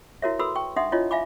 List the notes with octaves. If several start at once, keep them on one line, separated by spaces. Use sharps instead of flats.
E4 F#4 A#4 C#5 E5
F#4 A4 B4 B5 C6 E6
G5 C#6
D4 D#4 E5 F#5 C6 D#6
D4 E4 F4 C#5 D#5
E5 F5 G#5 B5 D6